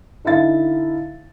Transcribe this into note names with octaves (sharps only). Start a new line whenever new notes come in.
D3 D#4 E4 E5 F5 A6